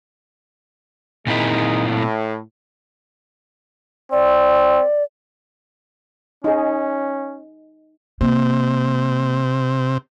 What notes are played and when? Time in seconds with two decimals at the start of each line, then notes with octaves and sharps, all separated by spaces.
1.27 A#2 D#3 G#3 C4 D#4 E4
1.86 A2
4.12 C4 D5
6.44 C#4 D#4 G#4
8.21 C3 A#3